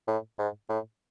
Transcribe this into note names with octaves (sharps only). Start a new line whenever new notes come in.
A2
G#2
A2